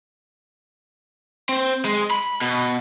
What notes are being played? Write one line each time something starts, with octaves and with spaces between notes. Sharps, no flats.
C4
G#3
B5
B2